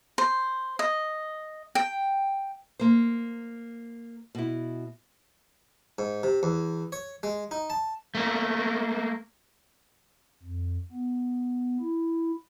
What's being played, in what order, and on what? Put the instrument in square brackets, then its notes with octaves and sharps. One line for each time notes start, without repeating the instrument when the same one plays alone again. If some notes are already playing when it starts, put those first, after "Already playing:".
[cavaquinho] C5
D#5
G5
[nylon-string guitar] A#3 C5
B2 E4
[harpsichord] G#2
C3
E2
C#5
G#3
D#4
A5
[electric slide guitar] A3 A#3
[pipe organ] F2
B3
E4